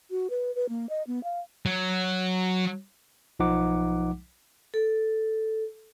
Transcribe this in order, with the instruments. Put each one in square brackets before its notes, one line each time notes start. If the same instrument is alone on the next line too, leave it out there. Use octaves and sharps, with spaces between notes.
[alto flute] F#4
B4
B4
A#3
D#5
B3
F5
[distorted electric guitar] F#3
[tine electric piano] B1 F3 D#4 F#5 D6
[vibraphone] A4